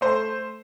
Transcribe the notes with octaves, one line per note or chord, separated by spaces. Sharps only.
A3 C5